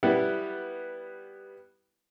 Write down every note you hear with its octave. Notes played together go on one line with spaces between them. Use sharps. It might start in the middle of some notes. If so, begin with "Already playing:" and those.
G3 B3 E4